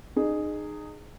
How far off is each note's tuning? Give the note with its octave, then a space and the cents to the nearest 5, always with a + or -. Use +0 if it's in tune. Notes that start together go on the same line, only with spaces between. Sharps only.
D#4 -30 G#4 +0